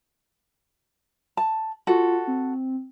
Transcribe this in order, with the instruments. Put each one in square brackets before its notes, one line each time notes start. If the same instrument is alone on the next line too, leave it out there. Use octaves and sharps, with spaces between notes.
[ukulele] A5
[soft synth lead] F4 [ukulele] F#4 A4
[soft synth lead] C4